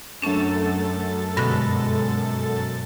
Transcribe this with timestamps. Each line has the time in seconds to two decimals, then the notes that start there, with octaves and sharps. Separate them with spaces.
0.22 F#2 F#3 A3 C#4 D4 A4 A6
1.37 G2 B2 D3 G#3